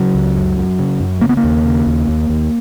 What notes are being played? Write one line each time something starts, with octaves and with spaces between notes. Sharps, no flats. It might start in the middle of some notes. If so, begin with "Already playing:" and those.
Already playing: C#3 F#3
C#2
F#2
F#2
C#3
F#2
C#3 A#3
B3
A#3
D#2
C#3
D#2
D#2
D#2